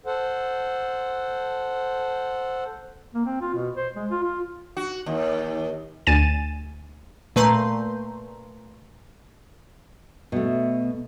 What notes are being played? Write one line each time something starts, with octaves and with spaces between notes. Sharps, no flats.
A4 C5 F#5
A#3
C4
F4
B2
C5
G#3
F4
F4
F#4
D#2
D2 G#5 A6 D#7 E7
A#2 A3 B4 A#5 C6 G6
B2 A3